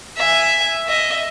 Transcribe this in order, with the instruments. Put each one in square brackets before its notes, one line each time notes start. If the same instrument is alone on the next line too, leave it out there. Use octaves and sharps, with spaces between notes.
[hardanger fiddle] E5 G#5
D#5 E5